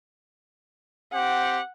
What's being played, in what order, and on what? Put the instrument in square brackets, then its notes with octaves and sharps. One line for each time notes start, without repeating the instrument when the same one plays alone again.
[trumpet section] C4 G4 [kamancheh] F#5